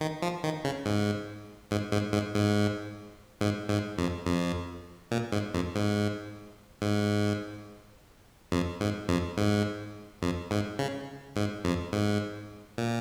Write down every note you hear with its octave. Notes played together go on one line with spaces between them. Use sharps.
D#3
F3
D#3
C#3
G#2
G#2
G#2
G#2
G#2
G#2
G#2
F2
F2
A#2
G#2
F2
G#2
G#2
F2
G#2
F2
G#2
F2
G#2
C#3
G#2
F2
G#2
A#2